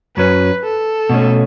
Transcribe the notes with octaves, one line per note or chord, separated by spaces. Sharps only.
F#2 F#3 C#4 B4
A4
B2 A3 C#4